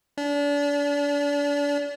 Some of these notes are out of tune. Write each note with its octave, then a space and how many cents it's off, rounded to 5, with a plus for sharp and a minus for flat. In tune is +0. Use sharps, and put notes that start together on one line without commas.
D4 -35